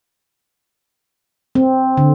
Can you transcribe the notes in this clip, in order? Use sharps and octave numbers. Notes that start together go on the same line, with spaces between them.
C4
D3